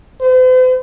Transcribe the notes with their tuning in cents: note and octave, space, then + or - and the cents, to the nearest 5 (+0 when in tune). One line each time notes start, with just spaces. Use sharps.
C5 -45